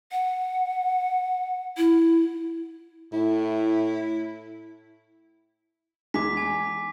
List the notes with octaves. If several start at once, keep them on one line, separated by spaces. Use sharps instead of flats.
F#5
E4
A2 E4
E2 G#3 D6 B6
G#5